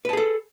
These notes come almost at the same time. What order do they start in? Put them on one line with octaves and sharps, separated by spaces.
B4 A5 G#4 A4